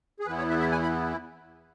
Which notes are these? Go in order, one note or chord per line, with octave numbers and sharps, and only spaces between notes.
G#4
E2 E3 B3 E4 B4
C#5
E5
E5
G#5
B5